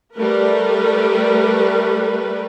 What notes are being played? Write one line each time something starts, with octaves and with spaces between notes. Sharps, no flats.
G3 A3 A#4 B4